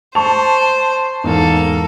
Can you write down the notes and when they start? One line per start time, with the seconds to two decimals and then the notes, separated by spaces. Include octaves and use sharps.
0.15 C5 A5 C#6 F7
1.24 E2 G#2 A#3 A4